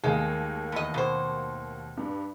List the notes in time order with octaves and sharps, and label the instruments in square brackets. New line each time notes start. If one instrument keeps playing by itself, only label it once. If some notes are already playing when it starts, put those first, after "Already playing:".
[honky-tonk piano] D#2 A3 F5 [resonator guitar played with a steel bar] G#3
[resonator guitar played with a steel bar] E2 D#5
B2 C5
[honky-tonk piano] G2